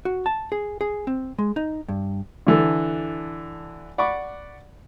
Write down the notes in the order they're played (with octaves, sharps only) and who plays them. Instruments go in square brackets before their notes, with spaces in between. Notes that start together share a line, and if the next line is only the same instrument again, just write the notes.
[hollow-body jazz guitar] F#4
A5
G#4
G#4
C4
G#3
D#4
G2
[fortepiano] D3 E3 A4
D5 F#5 B5 C#6 D6